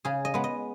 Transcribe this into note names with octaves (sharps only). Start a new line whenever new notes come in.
C#3 G#4
D#5
G#3 B3
D#5